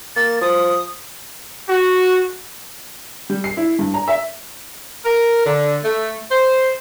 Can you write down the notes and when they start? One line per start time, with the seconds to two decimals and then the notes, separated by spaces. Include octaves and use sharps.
0.16 A#3 A6
0.41 F3 D#6
1.69 F#4
3.30 G3
3.44 C7
3.57 E4
3.79 G2
3.94 A#5
4.08 E5
5.05 A#4
5.46 D3
5.85 A3
6.31 C5